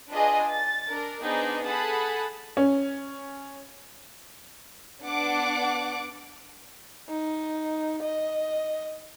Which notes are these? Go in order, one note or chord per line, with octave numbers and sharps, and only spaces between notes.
D4 F4 G#4 B4 D#5 G#5
A6
D4 A#4
B3 D4 D#4 G#4 C5
G#4 A4 F#5 A5 B5
C#4
B3 D4 F#5 D6
D#4
D#5